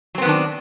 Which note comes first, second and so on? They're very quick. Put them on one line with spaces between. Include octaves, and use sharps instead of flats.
F#3 C4 B3 D#3 D4